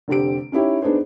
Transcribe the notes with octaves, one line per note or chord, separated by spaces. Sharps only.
F1 D3 C4 G4 D7
C#4 D#4 E4 G4 C#5
B3 D4 D#4 G#4 C5